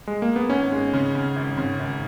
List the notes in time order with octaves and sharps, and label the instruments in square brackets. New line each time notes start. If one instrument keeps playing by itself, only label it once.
[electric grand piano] G#3
A#3
B3
[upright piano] G#1 [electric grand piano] C#4
[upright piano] G#3
C#3
C#3
G#1
C#3
G#1